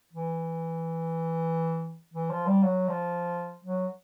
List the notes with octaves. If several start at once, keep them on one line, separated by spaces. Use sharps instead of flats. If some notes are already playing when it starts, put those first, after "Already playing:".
E3
E3
F3
G3
F#3
F3
F#3